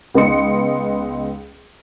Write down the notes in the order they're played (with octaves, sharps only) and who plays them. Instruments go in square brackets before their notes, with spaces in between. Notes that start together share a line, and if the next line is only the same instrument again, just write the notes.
[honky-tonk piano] C#2 B3 D#4 D#5 C6 C#7